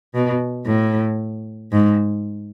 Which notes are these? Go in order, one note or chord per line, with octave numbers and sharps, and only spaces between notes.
B2
A2
G#2